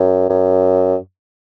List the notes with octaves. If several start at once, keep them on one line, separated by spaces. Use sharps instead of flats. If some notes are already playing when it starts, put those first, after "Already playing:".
Already playing: F#2
F#2